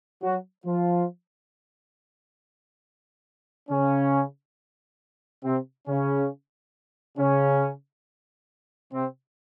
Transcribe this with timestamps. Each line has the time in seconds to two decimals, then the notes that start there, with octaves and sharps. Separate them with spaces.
0.22 F#3 F#4
0.65 F3 F4
3.70 C#3 C#4
5.43 C3 C4
5.87 C#3 C#4
7.18 C#3 C#4
8.92 C3 C4